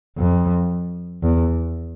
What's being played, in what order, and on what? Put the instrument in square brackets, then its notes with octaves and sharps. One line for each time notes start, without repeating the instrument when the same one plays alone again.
[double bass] F2
E2